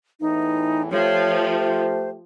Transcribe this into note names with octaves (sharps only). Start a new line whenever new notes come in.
E2 A2 E3 D#4
F3 A3 G4 C#5
C5